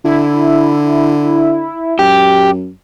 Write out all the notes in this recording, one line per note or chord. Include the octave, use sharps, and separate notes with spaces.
D3 E4
F#2 G4